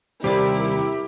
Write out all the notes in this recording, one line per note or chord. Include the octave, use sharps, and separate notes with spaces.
D#2 C3 G3 E4 G4 A#4 C5 D5